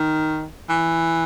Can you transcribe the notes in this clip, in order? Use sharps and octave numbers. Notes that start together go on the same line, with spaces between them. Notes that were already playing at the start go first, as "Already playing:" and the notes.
Already playing: D#3
E3